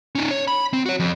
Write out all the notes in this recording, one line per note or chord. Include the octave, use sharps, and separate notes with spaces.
C#4 D#4
C#5
B5
C4
F#4 C#5
F2